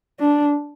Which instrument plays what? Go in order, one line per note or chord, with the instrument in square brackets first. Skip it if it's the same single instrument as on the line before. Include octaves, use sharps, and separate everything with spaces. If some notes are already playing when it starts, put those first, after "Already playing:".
[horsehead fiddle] D4